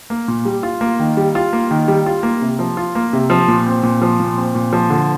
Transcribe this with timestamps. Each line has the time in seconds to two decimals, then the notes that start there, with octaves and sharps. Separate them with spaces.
0.10 A#3
0.28 A#2
0.45 G3
0.63 F4
0.81 A#3
1.00 D#3
1.17 G3
1.35 F4
1.53 A#3
1.71 D#3
1.88 G3
2.06 F4
2.23 A#3
2.42 C3
2.59 F3
2.77 F4
2.95 A#3
3.13 C3
3.30 F3
3.48 A#2
3.67 C4
3.83 A#2
4.02 F3
4.20 A#2
4.38 C4
4.55 A#2
4.73 F3
4.90 D3